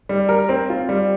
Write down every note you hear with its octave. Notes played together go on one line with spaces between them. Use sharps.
G3
A#4
C4
F4
G3